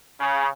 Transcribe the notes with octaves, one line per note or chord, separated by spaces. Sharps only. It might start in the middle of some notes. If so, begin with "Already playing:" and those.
C#3